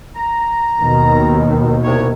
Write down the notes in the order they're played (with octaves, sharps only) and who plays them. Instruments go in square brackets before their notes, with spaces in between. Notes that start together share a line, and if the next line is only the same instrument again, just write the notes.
[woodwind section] A#5
[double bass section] D#2 B2 D#3
[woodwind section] C2 C3 C#5